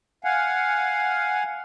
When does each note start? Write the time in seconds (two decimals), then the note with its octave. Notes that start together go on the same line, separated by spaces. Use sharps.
0.24 F5 F#5 G#5